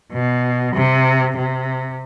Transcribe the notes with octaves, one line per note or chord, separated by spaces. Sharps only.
B2
C3
C3